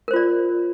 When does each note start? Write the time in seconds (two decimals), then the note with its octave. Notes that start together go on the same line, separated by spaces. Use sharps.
0.08 A#4
0.11 C5
0.13 F4
0.16 D5